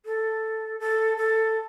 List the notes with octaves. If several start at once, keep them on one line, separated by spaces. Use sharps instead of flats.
A4
A4
A4